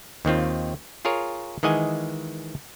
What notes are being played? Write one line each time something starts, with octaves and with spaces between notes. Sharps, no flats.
D#2 D#3 C4 F4
F4 G#4 A#4 C#5
D#3 E3 G#3 D#5 F#5 G#5